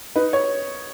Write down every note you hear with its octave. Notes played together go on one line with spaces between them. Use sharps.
D#4 B4
C#5